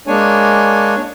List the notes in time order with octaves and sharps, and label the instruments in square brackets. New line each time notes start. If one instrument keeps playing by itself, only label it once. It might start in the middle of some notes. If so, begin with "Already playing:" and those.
[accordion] G#3 A#3 D4 C#5 G#5